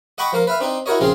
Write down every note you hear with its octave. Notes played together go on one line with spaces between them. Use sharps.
D#5 F#5 G5 B5 C#6 D6
F3 A#3 A#4
B4 E5 F5
C4 D4 D#4
E4 F#4 A#4 C#5 D#5
A#1 C#3 C4 F4 G#4